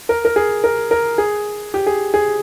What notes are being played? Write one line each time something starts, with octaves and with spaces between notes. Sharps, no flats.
A#4
A#4
G#4
A#4
A#4
G#4
G4
G#4
G#4